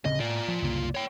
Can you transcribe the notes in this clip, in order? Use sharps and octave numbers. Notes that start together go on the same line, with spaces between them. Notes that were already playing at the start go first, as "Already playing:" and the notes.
D1 C#3 C4 D#5
A2 F4 D5
F3
F#1 C2 A#3
C#5 G5